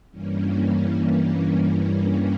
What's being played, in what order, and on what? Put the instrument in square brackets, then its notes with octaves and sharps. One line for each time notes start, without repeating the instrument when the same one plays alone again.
[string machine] G2 E3 G3 A#3 C#4